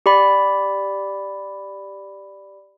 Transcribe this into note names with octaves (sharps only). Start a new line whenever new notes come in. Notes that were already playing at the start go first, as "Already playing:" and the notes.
G4 D5 B5